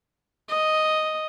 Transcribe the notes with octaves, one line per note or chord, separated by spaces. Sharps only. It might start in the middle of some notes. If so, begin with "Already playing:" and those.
D#5